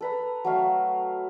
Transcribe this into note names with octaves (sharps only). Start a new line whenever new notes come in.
A4 B4 A#5
F#3 A3 F5